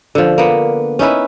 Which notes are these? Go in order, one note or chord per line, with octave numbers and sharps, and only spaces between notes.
D3 F3
A#3 B3
C#4 D#4 E4 B4